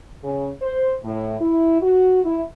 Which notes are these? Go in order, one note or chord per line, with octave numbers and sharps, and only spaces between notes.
C#3
C5
A2
E4
F#4
E4